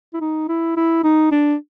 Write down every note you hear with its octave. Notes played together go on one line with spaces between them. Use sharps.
E4
D#4
E4
E4
D#4
D4